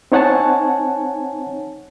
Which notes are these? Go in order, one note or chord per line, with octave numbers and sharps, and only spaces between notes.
C4 D#4 C#5 F#5 G#5 A5